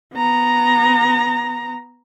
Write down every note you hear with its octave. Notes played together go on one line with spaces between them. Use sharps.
B3 A#5